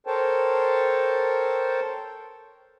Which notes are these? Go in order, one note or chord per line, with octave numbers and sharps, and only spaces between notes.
A4 A#4 C5 C#5 G5 A5